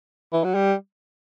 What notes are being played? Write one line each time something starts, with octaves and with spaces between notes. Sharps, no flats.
E3
F#3
G3